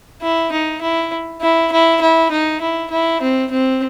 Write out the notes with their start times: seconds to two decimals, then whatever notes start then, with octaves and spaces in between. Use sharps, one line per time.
0.22 E4
0.52 D#4
0.82 E4
1.41 E4
1.72 E4
2.01 E4
2.31 D#4
2.61 E4
2.91 E4
3.21 C4
3.51 C4